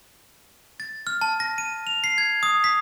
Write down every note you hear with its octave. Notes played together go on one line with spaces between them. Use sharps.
A6
F6
A5
A#6
D#7
F7
C7
G#6
D#6
B6